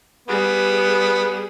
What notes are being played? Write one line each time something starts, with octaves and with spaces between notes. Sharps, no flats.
G3 B3 G#4